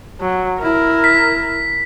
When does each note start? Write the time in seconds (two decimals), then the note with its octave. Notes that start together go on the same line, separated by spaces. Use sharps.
0.21 F#3
0.62 E4 A#4
1.04 B6